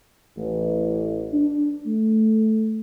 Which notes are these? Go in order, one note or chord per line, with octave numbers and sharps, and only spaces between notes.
A1
D4
A3